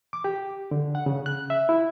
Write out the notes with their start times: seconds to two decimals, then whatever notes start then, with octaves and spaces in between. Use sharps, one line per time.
0.13 D6
0.24 G4
0.71 D3
0.95 F#5
1.06 C#3
1.26 F#6
1.50 E5
1.69 E4